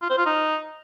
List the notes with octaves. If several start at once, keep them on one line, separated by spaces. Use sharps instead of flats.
F4
C5
F4
D#4